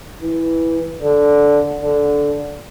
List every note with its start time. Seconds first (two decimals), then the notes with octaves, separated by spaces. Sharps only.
0.22 E3
1.02 D3
1.81 D3